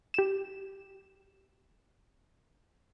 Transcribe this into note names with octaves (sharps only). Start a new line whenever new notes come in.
G4 E7